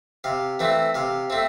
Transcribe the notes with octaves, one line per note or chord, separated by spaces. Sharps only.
C3 F5
E3 A3 C4
C3 F5
A3 C4